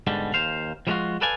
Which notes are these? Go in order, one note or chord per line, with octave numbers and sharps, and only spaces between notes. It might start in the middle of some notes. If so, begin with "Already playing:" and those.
G#2 B2 D3 G3 G#3
D#2 C5 F5
F3 G3 G#3 D4 F4 F#4
A4 B4 D5 F5 G#5